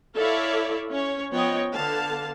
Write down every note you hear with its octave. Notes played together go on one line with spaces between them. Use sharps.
E4 A4 C#5 D5 E5 F5
C#4 C#5
F3 B3 C#5 D#5 G5
D3 B3 F5 A5